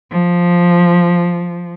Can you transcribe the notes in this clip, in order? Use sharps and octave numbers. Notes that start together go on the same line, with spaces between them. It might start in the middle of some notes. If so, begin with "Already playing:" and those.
F3